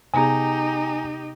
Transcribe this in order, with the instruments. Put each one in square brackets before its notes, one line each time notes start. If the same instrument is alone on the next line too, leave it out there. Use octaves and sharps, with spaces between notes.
[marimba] C3 B3 G#4 [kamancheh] D#4 G4 [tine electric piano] G#5 A#5